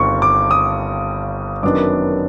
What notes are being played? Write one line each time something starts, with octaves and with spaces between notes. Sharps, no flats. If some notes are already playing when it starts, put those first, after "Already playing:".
Already playing: G1 G2 D#3 G3 C4 C#6
D6
D#6
F#2 D#3 F#3 B3 D4 D6